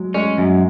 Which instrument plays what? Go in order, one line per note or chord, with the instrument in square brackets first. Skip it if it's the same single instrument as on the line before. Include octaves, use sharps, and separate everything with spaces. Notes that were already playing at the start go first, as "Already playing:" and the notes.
Already playing: [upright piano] F#3 G#3
[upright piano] G#3 [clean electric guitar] C#4
[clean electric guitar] F#2